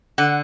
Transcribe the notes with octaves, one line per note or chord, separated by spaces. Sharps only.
D3 F#5